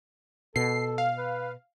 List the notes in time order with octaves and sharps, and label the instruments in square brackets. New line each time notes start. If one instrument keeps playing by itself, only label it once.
[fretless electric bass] B2 [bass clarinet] A4 [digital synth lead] C7
[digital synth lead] F5
[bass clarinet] B4